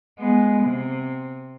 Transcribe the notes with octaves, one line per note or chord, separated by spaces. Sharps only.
G#3 B3
C3